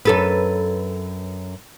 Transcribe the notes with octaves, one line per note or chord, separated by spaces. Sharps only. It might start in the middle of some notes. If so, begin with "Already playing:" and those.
F#2 A4 B4